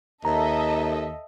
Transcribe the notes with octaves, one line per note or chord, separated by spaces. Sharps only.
D#2 A4 D#5 E5 A#5